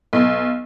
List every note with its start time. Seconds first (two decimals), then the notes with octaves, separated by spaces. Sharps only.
0.13 B1